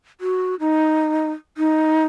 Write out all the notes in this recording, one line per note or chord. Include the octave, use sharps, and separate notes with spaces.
F#4
D#4
D#4